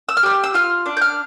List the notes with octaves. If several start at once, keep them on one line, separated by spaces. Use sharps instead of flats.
E6
F6
G4 E6
E6
F4 F6
D4
G6
F6